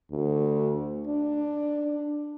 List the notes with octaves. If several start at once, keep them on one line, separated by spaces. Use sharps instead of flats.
D2
D4